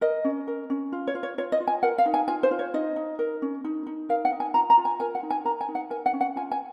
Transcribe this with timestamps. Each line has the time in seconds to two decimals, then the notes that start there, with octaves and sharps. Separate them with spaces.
0.01 A#4 D#5
0.24 C#4
0.47 A#4
0.70 C#4
0.92 F4
1.07 C#5
1.15 F4
1.23 C#5
1.38 F4 C#5
1.52 D#5
1.60 F4
1.67 G#5
1.83 A#4 F#5
1.98 F5
2.06 D#4
2.14 G#5
2.28 F4 G#5
2.43 C5
2.51 F4
2.59 C#5
2.74 D#4 D#5
2.96 D#4
3.19 A#4
3.42 C#4
3.64 D#4
3.87 D#4
4.09 A#4 F5
4.25 F#5
4.32 D#4
4.40 G#5
4.54 F4 A#5
4.70 A#5
4.78 F4
4.85 G#5
5.00 A#4 G#5
5.15 F#5
5.23 D#4
5.30 G#5
5.45 A#4 A#5
5.61 G#5
5.68 D#4
5.75 F#5
5.90 A#4 G#5
6.06 F#5
6.13 C#4
6.21 F#5
6.36 F4 G#5
6.51 G#5